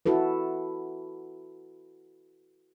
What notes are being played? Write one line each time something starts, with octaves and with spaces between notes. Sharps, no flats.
E4 F#4 A4 B4